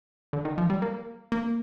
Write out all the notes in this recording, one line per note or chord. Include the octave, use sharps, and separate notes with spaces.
D3
D#3
F3
G3
A#3
A#3